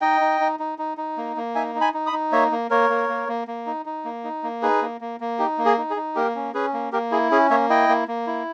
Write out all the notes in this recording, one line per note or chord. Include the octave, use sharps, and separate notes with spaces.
D#4 D#5 G5
D#4
D#4
D#4
D#4
D#4
A#3
A#3
D#4 E5 G#5
D#4
G#5 B5
D#4
B5 D#6
D#4
A#3 C#5 E5
A#3
A#3 A#4 C#5
A#3
A#3
A#3
A#3
D#4
D#4
A#3
D#4
A#3
D#4 G#4 B4
A#3
A#3
A#3
D#4 G4
A#3
G#4
D#4
G#4
D#4
A#3 G4 A#4
C#4
C#4 G#4 B4
A#3
A#3 G4 A#4
E4 G#4
C#4 G#4
A#3 C#5 E5
E4 D#5 G5
A#3
A#3
E4